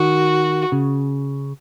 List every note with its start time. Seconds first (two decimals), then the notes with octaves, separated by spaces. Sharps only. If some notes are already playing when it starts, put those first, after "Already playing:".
Already playing: D#3 F#4
0.72 C#3